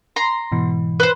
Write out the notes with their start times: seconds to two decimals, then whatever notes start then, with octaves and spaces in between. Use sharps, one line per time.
0.16 A#5 C6
0.52 G#2 B2 E3
1.00 B4 C5